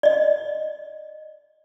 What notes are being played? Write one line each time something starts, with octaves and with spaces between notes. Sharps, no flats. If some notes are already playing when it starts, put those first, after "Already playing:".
D5 D#5